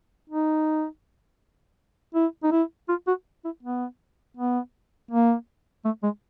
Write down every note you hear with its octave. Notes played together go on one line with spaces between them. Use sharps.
D#4
E4
D#4
E4
F4
F#4
E4
B3
B3
A#3
A3
G#3